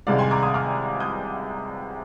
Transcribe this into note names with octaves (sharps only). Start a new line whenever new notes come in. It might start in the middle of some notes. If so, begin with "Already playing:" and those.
C2 C3 D#3 G#3 D5 F5
G#5 C6
A#5 D6
C6 D#6
D6 F6
D#6 G6